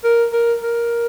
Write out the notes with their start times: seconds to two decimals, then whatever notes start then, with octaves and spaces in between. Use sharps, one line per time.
0.04 A#4
0.33 A#4
0.63 A#4